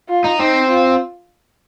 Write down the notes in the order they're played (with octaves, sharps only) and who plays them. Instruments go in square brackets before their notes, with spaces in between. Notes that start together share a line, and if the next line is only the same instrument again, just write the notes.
[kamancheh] F4
[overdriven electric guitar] D#4
[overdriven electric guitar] C4 [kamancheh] D#4
[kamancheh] F4